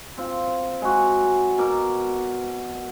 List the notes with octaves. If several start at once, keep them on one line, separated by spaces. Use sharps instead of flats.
C4 F4
G#3 F#4
B2 A#4 D6